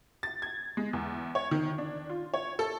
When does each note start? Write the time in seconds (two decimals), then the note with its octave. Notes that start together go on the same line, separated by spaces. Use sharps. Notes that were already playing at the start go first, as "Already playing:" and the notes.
0.23 A6
0.42 G#6
0.77 G#3
0.93 E2
1.35 C#5
1.51 D#3
1.78 D4
2.09 F4
2.34 C#5
2.59 A4